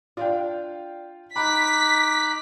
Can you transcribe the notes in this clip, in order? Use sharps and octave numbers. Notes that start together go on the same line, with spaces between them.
D4 F4 F5 G5
D#4 B5 D6 F#6 B6